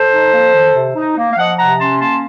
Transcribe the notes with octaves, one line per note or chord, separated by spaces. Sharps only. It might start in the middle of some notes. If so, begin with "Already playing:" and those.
Already playing: A4 C5
D#4
A#3
D#3
C3
D#4
A#3
F5
F3 D#5 F#5
C3 F#5 A#5
C#4 A5 C6
A#3 A5 C6